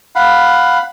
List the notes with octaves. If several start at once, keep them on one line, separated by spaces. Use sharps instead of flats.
F5 F#5 B5